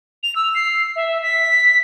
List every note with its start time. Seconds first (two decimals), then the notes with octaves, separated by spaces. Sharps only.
0.23 F7
0.35 E6
0.55 C7
0.96 E5
1.22 B6